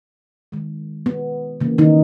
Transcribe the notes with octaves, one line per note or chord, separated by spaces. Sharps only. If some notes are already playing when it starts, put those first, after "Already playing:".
D#3 G#3
B3
C#3 E3 A#3
D#3 D#4